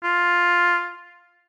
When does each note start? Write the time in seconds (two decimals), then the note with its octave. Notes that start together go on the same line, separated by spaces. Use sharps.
0.03 F4